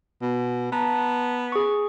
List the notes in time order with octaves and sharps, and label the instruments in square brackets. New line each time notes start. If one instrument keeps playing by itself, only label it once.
[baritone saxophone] B2
[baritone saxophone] B3 [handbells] A5 A#5
[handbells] G#4 C#6